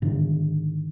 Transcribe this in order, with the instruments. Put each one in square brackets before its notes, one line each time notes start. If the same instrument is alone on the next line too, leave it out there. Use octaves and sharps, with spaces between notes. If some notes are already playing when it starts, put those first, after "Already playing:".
[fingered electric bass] G#2 D3 D#3